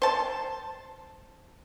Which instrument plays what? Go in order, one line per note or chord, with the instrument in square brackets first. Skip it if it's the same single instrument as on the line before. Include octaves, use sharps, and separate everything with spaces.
[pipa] C5 A5